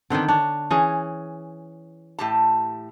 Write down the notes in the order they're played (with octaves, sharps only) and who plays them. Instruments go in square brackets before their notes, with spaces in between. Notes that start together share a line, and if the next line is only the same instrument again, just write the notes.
[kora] D3 D#3 [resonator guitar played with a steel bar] B3 C4 D4
[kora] D4 [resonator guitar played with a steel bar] C#5
[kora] E3 C#4 G#4
[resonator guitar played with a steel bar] A2 G4 A5